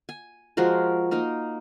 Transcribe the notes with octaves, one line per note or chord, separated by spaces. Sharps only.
G#5
F3 G#3 F#4 A#4
A#3 D#4 A#4